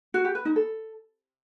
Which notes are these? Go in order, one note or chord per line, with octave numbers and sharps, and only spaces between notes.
F#4
G4
B4
D#4
A4